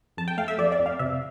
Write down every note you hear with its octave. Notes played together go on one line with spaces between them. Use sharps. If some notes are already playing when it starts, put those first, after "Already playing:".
F2 A5
G5
A3 F5
E5
F2 D5
D5
F2
F5
C3 E5